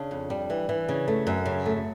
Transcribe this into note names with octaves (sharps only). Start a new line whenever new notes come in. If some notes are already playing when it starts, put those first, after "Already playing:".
Already playing: C#3 D4
F2
G3
E3
E3
C#3
A3
F#2
C#3
A3